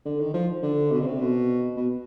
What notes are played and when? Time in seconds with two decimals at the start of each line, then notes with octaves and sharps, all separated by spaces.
0.05 D3
0.20 D#3
0.34 F3
0.63 D3
0.91 B2
1.00 D3
1.06 C3
1.20 B2
1.77 B2